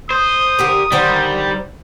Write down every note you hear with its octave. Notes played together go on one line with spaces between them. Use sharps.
C5 D#6
D3 G4 A#4
D3 D#3 G3 C5